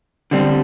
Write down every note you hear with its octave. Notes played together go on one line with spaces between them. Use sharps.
D3 G3 C4